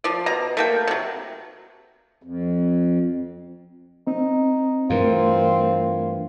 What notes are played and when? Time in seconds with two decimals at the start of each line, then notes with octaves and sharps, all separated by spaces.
0.04 F3 D5
0.26 B2 A#5
0.57 A3 A#3 G5
0.87 C3 F#3
2.23 F2
4.07 C4 D#4
4.90 G2 E3 A3 C4 F4 A#4